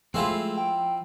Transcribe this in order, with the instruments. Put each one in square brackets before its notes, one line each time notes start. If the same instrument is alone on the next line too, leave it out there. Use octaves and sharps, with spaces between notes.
[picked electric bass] F3 [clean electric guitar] G#3 A3 G#4 [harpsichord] C4 E4 F4
[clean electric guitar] G5